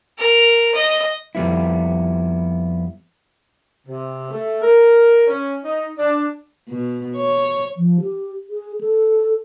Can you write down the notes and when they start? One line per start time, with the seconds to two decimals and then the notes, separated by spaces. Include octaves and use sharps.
0.19 A#4
0.74 D#5
1.35 F2 G3 B3 E4
3.86 C3
4.31 A3
4.62 A#4
5.27 C#4
5.62 D#4
5.97 D4
6.68 B2
7.17 C#5
7.77 F3
8.01 G4
8.50 G#4
8.81 A4